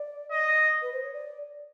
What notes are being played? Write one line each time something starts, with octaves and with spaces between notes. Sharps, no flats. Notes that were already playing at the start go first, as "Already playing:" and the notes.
Already playing: D5
D#5
B4
C5
C#5
D5